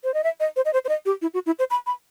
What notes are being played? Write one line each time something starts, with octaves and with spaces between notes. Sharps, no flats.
C5
D#5
E5
D#5
C5
D#5
C5
C5
D#5
G4
E4
F#4
E4
C5
B5
B5